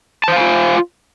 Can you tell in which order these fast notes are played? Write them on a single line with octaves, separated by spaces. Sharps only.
A5 C5 F5 G#5 F4